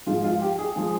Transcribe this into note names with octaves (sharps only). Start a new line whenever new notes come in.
G#2 F3 G#3 F4
F4
G4
G#4
F3 G#3 G#4